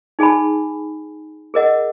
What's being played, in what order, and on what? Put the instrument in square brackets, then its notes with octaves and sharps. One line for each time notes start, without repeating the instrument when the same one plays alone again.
[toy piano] D#4 G#4 G#5 A5 B5
G#4 A#4 D#5 F#5